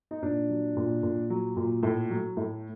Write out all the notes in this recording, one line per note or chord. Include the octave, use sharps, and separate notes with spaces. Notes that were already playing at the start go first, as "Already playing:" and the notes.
D#4
A#2 D4
F#3
A#2
A#2
F#3
A#2
A2
F#3
A2